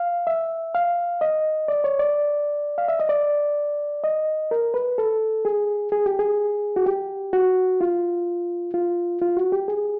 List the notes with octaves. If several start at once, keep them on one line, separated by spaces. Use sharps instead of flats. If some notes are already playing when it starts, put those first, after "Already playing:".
Already playing: F5
E5
F5
D#5
D5
C#5
D5
F5
E5
D#5
D5
D#5
A#4
B4
A4
G#4
G#4
G4
G#4
F#4
G4
F#4
F4
F4
F4
F#4
G4
G#4